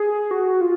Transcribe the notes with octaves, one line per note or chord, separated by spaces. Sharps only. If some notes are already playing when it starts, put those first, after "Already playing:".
Already playing: G#4
F#4
F4